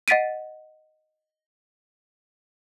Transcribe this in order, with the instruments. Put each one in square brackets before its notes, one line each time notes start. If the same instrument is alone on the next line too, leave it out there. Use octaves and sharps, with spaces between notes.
[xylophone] D#5 F#5 A6 B6 D7 D#7